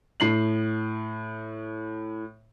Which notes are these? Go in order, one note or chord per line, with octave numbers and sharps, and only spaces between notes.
A2 C7 F#7